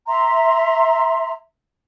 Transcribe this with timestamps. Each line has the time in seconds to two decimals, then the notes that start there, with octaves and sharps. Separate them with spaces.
0.08 E5 A#5 C6